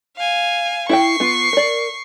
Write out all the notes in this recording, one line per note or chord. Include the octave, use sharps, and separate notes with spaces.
F5 G#5
E4 F5 G5 C#6 C7
B3 F4
A#4 D5